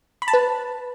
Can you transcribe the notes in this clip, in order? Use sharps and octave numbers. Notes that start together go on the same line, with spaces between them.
B5
A5
B4